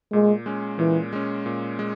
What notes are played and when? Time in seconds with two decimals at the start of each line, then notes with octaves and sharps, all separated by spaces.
0.12 A#2 G#3
0.46 G#3 C#4
0.79 A#2 E3
1.13 G#3 C#4
1.46 A#2
1.79 G#3